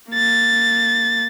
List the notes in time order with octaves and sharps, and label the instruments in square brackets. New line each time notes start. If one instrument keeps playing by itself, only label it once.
[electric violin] A#3 A6